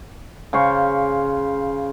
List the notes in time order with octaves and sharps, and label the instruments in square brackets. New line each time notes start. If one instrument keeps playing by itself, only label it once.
[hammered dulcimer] C#3 C5 F5 C#6